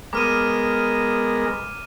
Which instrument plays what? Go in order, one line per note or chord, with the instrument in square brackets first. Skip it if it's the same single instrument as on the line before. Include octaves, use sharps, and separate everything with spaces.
[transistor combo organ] G#3 B3 A#4 [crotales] D6 F6 D#7